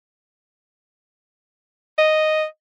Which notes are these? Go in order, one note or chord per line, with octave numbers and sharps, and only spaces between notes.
D#5